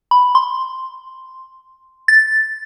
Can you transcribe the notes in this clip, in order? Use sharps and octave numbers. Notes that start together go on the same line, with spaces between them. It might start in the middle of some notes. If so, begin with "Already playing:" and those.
B5
C6
A6